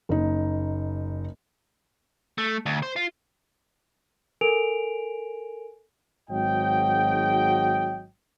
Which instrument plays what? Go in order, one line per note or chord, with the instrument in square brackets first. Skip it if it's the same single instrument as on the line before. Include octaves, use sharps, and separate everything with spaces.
[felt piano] F#1 D#4
[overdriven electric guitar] A3
D2
C5
F4
[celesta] A4 A#4 G#5 D7 F7
[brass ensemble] G#1 G#2 F#3 F#4 D#5 G5